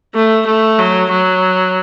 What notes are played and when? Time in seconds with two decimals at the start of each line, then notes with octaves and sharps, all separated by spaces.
0.15 A3
0.47 A3
0.79 F#3
1.11 F#3